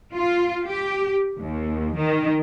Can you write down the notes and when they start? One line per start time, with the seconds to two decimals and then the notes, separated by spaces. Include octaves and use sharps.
0.15 F4
0.66 G4
1.40 D#2
1.97 D#3